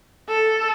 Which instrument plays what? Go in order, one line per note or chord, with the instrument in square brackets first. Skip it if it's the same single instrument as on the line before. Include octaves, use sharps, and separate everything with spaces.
[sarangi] A4